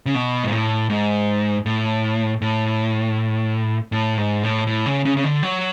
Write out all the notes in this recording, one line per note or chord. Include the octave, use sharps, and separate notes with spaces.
C#3
B2
G#2
A2
G#2
A2
A2
A2
G#2
A2
A2
C#3
C#3
C#3
D3
F#3